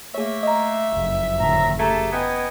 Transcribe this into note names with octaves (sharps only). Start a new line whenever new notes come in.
A3 A#3 G#4 C#5 E5
D#5 A#5
F#1 F2
A2 D3 D#3 F#3 A#5
A3 G4 G#4 A5 A#5 G#6
B3 D#5 G5 G#5